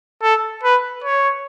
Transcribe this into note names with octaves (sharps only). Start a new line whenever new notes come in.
A4
B4
C#5